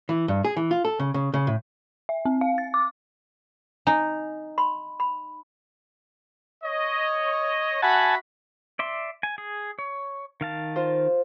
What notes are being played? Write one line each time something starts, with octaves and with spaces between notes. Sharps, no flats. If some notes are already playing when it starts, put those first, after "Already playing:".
E3
G2
G#4
E3
F4
A4
C#3
C#3
C#3
A2
E5
C4
F5
A6
D6
D#4 G#5
B5 C6
B5
C#5 D#5
F#4 E5 F#5 G#5 A5 B5
D5 E5 C6
G#5
G#4
C#5
D#3 F5 A5
F4 C5